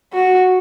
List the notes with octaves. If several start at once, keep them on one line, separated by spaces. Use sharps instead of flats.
F#4